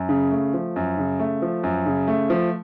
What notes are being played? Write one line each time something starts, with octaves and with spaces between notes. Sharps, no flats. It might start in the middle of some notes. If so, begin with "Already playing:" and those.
Already playing: F#2
C#3
A3
F3
F#2
C#3
A3
F3
F#2
C#3
A3
F3